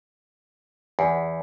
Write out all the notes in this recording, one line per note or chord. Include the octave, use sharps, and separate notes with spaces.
E2